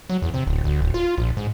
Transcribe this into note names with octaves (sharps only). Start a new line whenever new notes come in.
F#3
E2
C3
D1
D2
D1
F4
A#1
G#2